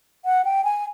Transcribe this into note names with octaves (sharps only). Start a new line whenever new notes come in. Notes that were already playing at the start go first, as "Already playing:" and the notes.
F#5
G5
G#5